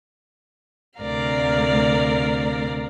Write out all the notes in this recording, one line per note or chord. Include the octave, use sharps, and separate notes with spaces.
D2 C3 A#4 D5 F5